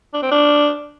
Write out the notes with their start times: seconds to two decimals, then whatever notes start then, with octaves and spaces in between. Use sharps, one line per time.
0.14 D4
0.23 C4
0.31 D4